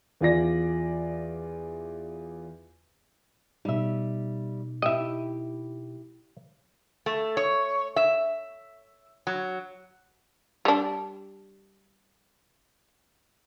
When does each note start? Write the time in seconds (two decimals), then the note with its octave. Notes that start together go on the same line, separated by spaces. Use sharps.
0.21 E2 F4 D5 A#6
3.65 B2 G3 D#4 E5
4.82 E4 G4 D#5 E5
7.06 A3
7.37 C#5
7.96 E5
9.27 F#3
10.65 G3 D4